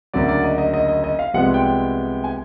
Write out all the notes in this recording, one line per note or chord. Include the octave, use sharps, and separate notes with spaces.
D2 C#3 F#3 A#3 D5
D5
D#5
D#5
D#5
D#5
D#5
F5
C2 C3 F3 G#3 B3 F#5
G5
G#5